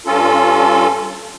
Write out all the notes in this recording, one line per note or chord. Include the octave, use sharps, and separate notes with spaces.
G2 C#4 F4 A4